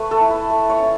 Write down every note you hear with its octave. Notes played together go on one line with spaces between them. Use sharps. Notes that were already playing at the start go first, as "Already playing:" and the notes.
Already playing: A3 B4 C#5
A4
E4
B4
A3
C#5
C#4 E4